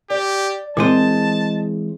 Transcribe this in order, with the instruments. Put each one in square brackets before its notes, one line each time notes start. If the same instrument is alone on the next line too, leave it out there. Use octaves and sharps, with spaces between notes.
[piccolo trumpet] G4 [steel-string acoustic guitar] D5
[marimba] A#2 C4 [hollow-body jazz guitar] E3 G#3 C5 [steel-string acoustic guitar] D#5 [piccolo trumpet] A5